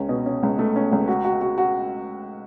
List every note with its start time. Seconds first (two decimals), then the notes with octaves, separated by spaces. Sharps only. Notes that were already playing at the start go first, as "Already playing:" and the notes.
Already playing: C#2 C#4
0.09 B2
0.26 C#4
0.43 C#2
0.59 A3
0.76 C#4
0.92 C#2
1.08 F#4
1.24 F#4
1.41 F#4
1.58 F#4